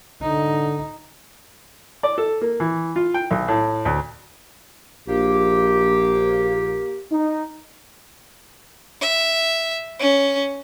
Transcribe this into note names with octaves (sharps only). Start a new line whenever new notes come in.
D3 D#4
D5
A4
A#3
E3
F4
G5
B1
A2
D2
A#1 A#3 G4
D#4
E5
C#4